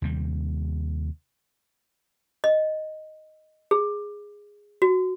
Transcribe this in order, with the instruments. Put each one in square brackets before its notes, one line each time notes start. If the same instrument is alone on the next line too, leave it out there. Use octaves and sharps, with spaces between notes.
[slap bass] D#2 C3 G3
[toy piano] D#5
G#4
F#4